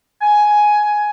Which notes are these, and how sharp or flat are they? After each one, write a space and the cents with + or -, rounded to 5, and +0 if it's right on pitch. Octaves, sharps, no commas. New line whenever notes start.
G#5 +10